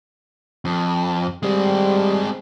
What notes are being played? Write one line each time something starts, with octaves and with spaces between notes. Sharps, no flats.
F2
G3 G#3 C4